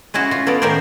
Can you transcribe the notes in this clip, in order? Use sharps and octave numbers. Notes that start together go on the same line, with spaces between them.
G#3 C#4 E4 F#4
C#4 F4
B3 A4 C#5 D5
A2 D#3 C#4 A#4 C5 D5